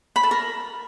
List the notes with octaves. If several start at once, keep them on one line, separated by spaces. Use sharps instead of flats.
B5
A4
A#4